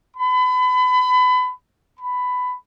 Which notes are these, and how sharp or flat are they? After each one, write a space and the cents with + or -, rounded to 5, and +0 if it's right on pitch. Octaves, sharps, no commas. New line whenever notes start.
B5 +30
B5 +15